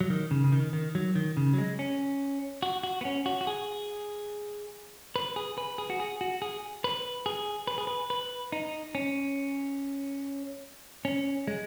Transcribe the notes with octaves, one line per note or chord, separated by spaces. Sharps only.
F#3
D#3
C#3
C#3
D#3
D#3
F#3
D#3
C#3
F#3
G#3
C#4
F#4
F#4
B3
C#4
F#4
F#4
G#4
B4
G#4
B4
G#4
F#4
G#4
F#4
G#4
B4
G#4
B4
G#4
B4
B4
D#4
C#4
C#4
G#3